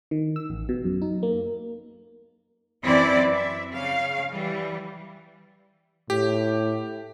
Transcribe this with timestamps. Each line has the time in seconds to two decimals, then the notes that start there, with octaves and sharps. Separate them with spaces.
0.11 D#3
0.36 E6
0.50 A1
0.69 B2
0.84 F#2
1.02 D#4
1.23 A#3
2.85 F#2 E3 C4 E4 D5
3.33 E5
3.73 C#3 F5
4.30 E3 G3
6.10 A2 G4